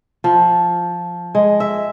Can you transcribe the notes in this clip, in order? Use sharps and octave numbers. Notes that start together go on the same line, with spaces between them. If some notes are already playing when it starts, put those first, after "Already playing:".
F3
G#3
E5